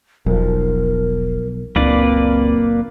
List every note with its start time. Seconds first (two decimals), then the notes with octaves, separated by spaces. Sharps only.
0.26 E1 B1 F3 A#4
1.76 F#1 C#2 A#2 A#3 C4 D4 B4 D5